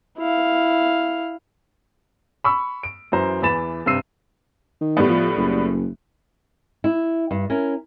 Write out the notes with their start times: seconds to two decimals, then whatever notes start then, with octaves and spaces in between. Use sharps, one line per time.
0.18 E4 F5
2.44 B5 C#6 E6
2.83 D7
3.12 F#2 E3 F#3 C5 A#5
3.42 E2 E3 B5 A6 E7
3.86 G2 C3 C4 E6 C7 D#7
4.81 D#3
4.97 A2 G3 B3
5.09 F3
5.37 F#1
6.84 E4
7.31 G2
7.50 C#4 E4 A#4